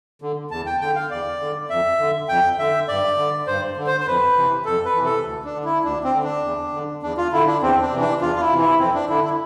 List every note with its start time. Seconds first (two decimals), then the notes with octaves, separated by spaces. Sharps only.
0.22 D3
0.51 E2 A5
0.66 G5
0.81 D3 G5
0.96 F5
1.10 E2 D5
1.40 D3
1.70 F2 E5
1.99 D3
2.28 F2 G5
2.59 D3 E5
2.88 G2 D5
3.18 D3
3.47 G2 C5
3.77 D3
3.87 C5
4.01 C5
4.07 F2 B4
4.37 C3 E3
4.65 F2 A4
4.85 B4
4.96 C3 E3
5.05 A4
5.25 D2
5.45 D4
5.54 D3
5.64 E4
5.84 D2 D4
6.04 C4
6.14 D3
6.24 D4
6.43 E2
6.73 D3
7.03 E2 D4
7.17 F4
7.33 D3 E4
7.47 D4
7.61 E2 C4
7.81 D4
7.91 C3 E3
8.01 D4
8.21 E2 F4
8.36 F4
8.41 E4
8.51 C3 E3
8.61 E4
8.80 F2 C4
8.95 D4
9.10 D3 E4
9.24 E4